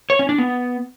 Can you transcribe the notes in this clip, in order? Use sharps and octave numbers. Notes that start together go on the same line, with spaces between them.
C#5
C#4
D4
B3